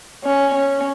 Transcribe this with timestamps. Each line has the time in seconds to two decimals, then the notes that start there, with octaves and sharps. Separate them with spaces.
0.24 C#4
0.55 C#4